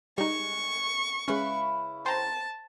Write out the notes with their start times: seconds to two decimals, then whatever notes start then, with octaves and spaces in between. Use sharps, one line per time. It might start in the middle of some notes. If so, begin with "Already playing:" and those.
0.18 G3 G#3 D#4 C#6
1.28 C#3 G#3 C#4 E4 B4
2.06 C5 G5 A5 A#5